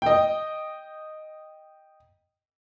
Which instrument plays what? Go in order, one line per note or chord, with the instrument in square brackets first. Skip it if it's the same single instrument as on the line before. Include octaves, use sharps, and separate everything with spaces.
[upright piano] D#5 G5